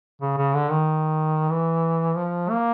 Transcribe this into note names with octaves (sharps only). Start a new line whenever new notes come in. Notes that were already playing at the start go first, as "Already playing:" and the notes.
C#3
C#3
D3
D#3
E3
F3
A#3